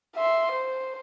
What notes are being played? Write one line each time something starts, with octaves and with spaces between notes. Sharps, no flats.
E5 C6
C5